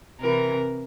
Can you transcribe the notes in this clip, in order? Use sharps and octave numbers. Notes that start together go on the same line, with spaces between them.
C3 E3 A#4